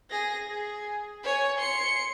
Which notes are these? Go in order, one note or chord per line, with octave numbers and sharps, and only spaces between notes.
G#4 A#6
G#4
C#5 G#5
C6 C#7